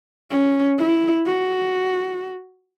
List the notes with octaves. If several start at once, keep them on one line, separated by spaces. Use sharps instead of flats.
C#4
E4
F#4